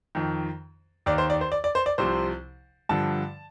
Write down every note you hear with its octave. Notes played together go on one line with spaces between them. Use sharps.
F2 D#3
D#2 D#3 D5
C5
D5
C5
D5
D5
C5
D5
C2 C3 F3 C5
G2 D3 F3 A5